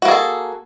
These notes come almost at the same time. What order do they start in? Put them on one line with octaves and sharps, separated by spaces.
F#4 A#3 G#4 A4